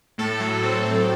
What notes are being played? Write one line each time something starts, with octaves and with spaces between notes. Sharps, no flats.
A2 A4
F#3
C4
C4